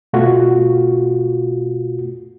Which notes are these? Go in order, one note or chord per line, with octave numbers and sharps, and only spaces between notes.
B2 A3 F4 F#4